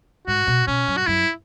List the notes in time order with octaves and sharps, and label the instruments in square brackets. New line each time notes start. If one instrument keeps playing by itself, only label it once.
[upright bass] G#2 [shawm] F#4
[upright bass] B2
[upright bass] B2 [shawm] C#4
[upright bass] F#2
[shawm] F#4
[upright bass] F#2 [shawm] E4